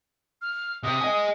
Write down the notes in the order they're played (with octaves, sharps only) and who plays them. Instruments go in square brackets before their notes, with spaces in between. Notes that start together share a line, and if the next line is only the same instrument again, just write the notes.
[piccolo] F6
[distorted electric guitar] C3 [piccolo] D#6
[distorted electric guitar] D#5 G#5